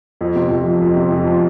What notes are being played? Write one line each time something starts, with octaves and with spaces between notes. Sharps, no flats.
F2
C3
F2
F3
F2
C3
F2
F3